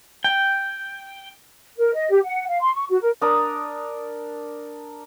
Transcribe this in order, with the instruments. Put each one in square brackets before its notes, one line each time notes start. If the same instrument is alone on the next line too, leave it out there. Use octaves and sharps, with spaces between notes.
[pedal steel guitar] G5
[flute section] A#4
D#5
G4
F#5
F5
C6
C#6
F#4
A#4
[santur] D4 A#4 D#6